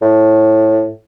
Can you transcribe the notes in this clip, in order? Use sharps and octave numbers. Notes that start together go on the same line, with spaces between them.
A2